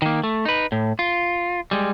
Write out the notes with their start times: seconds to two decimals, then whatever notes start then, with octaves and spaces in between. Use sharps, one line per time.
0.02 D#3 A#3
0.23 A3
0.45 D#4 B4
0.72 A2
0.99 F4
1.71 G3 G#3